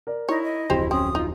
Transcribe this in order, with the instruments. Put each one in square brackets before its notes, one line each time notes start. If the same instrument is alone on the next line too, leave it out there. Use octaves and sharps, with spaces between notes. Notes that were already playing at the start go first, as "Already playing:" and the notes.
[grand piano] A#4 D5
[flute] D#4 [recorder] E4 [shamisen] C#5
[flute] D#5
[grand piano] D1 F2 C6 [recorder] E4 [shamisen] G4 C5
[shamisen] C4 [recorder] C#4 [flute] D#6
[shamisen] D#4 [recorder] F4